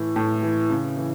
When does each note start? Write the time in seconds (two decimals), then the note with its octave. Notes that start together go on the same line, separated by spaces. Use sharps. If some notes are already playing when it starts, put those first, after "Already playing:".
Already playing: A2 E3
0.16 A2
0.42 E3
0.70 C#3
0.97 E3